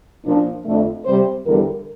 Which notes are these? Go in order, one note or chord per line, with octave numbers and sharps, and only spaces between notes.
A#2 F3 A#3 D4
F2 D3 A3
C3 G3 C4 C5
E2 D3 G3 A#4